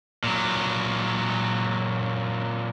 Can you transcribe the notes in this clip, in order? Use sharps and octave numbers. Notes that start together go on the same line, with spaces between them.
A#2 F#3